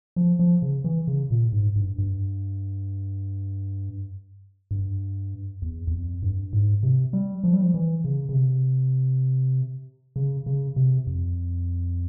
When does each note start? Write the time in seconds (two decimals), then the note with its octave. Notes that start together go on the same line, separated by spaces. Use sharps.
0.16 F3
0.39 F3
0.62 C#3
0.84 E3
1.07 C#3
1.31 A#2
1.53 G#2
1.76 G2
1.98 G2
4.71 G2
5.62 E2
5.87 E2
5.92 F2
6.23 G2
6.53 G#2
6.83 C3
7.13 G3
7.44 F3
7.53 G3
7.62 F3
7.74 E3
8.04 C#3
8.29 C#3
8.34 C3
10.16 C#3
10.46 C#3
10.76 C3
11.07 F2